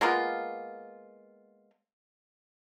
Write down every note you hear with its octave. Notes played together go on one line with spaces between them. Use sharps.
G#3 A#3 B3 F4